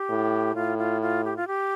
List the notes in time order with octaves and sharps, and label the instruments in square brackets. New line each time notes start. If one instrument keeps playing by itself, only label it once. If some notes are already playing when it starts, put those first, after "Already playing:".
Already playing: [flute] G4
[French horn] A2
[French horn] A2 [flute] F4
[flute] F4
F4
G4
F4
G4